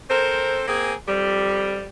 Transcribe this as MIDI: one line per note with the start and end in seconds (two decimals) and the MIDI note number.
0.10 0.63 60
0.10 0.63 69
0.10 0.63 70
0.10 0.63 72
0.68 0.93 58
0.68 0.93 60
0.68 0.93 68
1.08 1.87 41
1.08 1.87 55